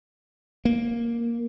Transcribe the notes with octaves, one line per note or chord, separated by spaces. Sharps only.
A#3